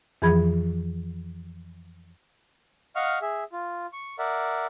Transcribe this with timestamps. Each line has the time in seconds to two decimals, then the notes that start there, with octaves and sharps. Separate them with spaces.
0.22 F2 E3 F3 G#4 B5 G#6
2.96 D#5 F5 F#5 C#6 F6
3.22 G#4 E5
3.52 F4
3.93 C#6
4.19 A#4 D5 E5 F#5